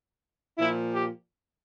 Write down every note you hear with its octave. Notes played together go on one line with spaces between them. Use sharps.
A#2 F3 E4
G4